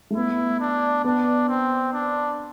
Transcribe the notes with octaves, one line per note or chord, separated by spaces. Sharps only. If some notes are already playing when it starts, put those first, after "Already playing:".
A3
B3 E4
D4
B3 D4
C4
D4